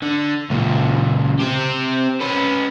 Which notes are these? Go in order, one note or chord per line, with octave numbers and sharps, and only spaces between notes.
D3
C#2 A#2
C4 G4
C#4 B4